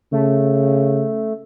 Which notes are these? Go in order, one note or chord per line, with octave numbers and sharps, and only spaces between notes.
C#3 A3